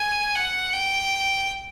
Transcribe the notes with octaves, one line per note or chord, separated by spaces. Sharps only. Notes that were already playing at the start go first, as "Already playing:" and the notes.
Already playing: G#5
F#5
G5